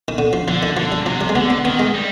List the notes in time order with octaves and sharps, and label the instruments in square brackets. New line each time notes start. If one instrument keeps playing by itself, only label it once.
[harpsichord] D#3
D3
F3
[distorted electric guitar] D3 [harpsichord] F3
[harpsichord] D#3
[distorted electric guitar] D3 [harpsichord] F3
[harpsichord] G3
[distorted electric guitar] C3 [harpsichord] F3
[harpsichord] G3
G#3
[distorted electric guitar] D3 [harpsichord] B3
[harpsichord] C4
[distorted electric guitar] D#3 [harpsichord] B3
[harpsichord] G#3
[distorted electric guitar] G3